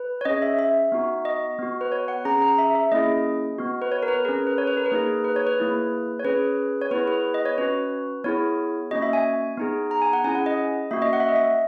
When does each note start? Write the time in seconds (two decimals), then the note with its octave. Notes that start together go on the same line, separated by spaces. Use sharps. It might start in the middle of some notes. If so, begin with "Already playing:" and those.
Already playing: B4
0.21 C#5
0.25 C#4 G#4 D#5
0.42 E5
0.59 E5
0.92 B3 D#4 F#4
1.25 D#5
1.58 B3 F#4
1.81 B4
1.92 C#5
2.08 F#5
2.25 C#4 G#4 A#5
2.42 A#5
2.58 E5
2.75 E5
2.92 A#3 C#4 E4 G#4 D#5
3.58 B3 F#4
3.82 B4
3.92 C#5
4.03 A#4
4.08 B4
4.25 C#4 G#4 A#4
4.47 B4
4.58 C#5
4.67 B4
4.77 A#4
4.86 B4
4.92 A#3 D#4 G#4
5.24 B4
5.36 C#5
5.47 B4
5.58 A#3 E4 G#4
6.19 C#5
6.25 C#4 G#4 B4
6.82 C#5
6.91 B3 E4 G#4 B4
7.08 B4
7.34 D#5
7.45 C#5
7.58 C#4 F#4 B4
8.24 B3 E4 G#4 C#5
8.91 A#3 C#4 F#4 D#5
9.02 E5
9.13 G#5
9.57 B3 D#4 G#4
9.91 A#5
10.02 G#5
10.13 F#5
10.24 C#4 E4 G#4 G#5
10.35 F#5
10.46 D#5
10.91 A#3 C#4 F#4 E5
11.02 D#5
11.13 F#5
11.20 E5
11.28 D#5
11.36 E5